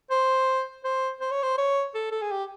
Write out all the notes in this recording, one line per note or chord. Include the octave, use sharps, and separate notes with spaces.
C5
C5
C5
C#5
C5
C#5
A4
A4
G#4
G4